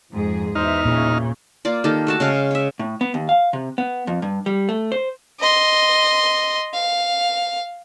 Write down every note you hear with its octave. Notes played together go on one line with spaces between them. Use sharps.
F2 G#2 G#4
E2 B2 D#4 C5 E5 F6
A#2 C#3
A#3 F4 D5
D#3 A#3 G4 A4
A3 F#4 A5
C#3 G#3 F5
C#5 E5
A2
B3
D#2
F5
C3
B3
F2
G2
G3
A3
C5
D#5 C6
F5